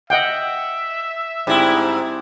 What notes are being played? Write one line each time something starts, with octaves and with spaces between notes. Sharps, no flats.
D#5 E5 F#5 G5
G#2 G3 C4 E4